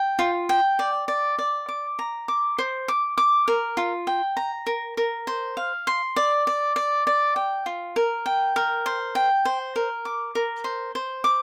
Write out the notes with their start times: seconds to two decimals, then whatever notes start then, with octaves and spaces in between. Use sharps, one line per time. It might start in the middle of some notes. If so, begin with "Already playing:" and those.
Already playing: G5
0.19 F4
0.49 G5
0.79 D5
1.08 D5
1.39 D5
1.69 D6
1.99 A#5
2.28 D6
2.58 C5
2.88 D6
3.18 D6
3.48 A#4
3.77 F4
4.07 G5
4.37 A#5
4.67 A#4
4.97 A#4
5.27 C5
5.57 F5
5.87 C6
6.16 D5
6.47 D5
6.76 D5
7.07 D5
7.36 G5
7.66 F4
7.96 A#4
8.26 G5
8.56 A#4
8.86 C5
9.15 G5
9.45 C5
9.76 A#4
10.05 D6
10.35 A#4
10.64 C5
10.95 C5
11.24 D6